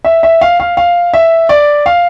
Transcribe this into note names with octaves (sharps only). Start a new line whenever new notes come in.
E5
E5
F5
F5
F5
E5
D5
F5